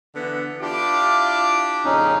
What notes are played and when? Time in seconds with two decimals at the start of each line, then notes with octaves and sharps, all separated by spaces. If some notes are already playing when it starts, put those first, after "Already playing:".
0.15 D3 E3 B3
0.61 D4 E4 F4 G4 D6
1.85 F2 A#2 C#3 C#4 D#4